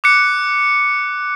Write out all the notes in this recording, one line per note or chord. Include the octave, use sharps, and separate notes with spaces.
D6 F#6 C#7